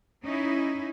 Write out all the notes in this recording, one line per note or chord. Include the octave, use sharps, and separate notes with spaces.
C#4 D#4 E4